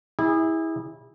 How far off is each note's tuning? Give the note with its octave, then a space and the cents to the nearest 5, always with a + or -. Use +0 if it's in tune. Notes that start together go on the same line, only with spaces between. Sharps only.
E4 -25 G#4 -35